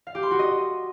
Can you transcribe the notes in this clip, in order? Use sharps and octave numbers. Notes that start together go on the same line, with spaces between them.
F5
G4
C6
F#4
D#5